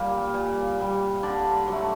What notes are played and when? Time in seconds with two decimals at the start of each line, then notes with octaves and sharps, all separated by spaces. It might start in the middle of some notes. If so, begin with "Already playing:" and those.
Already playing: A#2 G3 A#3 G5
0.34 A#2
0.78 G3 A#3
1.23 D3 D5
1.67 F#3 A3